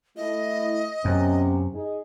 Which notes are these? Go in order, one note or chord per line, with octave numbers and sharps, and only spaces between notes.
A3 E4 D#5
F#2 C3 B3 C#4
D#4 G#4 D#5